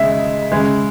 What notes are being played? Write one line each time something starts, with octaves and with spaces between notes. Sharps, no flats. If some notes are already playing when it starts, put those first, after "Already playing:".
Already playing: C#3 G#3 E5
C#3 G#3